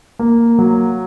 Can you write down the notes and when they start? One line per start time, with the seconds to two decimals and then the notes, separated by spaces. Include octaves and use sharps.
0.19 A#3
0.59 F#3